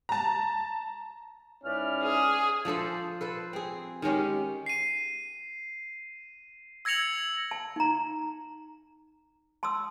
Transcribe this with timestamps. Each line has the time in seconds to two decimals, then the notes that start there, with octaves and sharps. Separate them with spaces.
0.09 A5 A#5
1.64 G#2 C#4 E4 B4 D5 F6
2.03 G#4
2.65 F3 D4 A4 C5
3.21 A4 B4 C5
3.53 C4 G#4
4.02 D#3 G#3 C#4 G4
4.66 C7 D#7
6.85 E6 G#6 A#6 C#7 F7 F#7
7.51 A5
7.76 D#4 A#5
9.63 A5 C6 D#6 E6